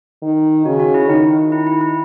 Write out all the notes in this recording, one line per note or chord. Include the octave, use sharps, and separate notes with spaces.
D#3
C#3 F#4
F#4
E4
D#3 D#4
E4
E4
E4